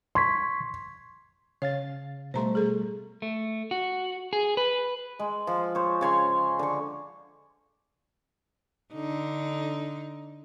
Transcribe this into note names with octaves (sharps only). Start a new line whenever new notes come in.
C6 C#6 G#6 B6
C#3 C#5 F5 A6
B2 G3 A3 C5 A#5 C6
G#4 A4
A3
F#4
G#4
B4
G#3
F3
C5 C#5
C#3 C#5 C6
D3 C#6
D3 D#4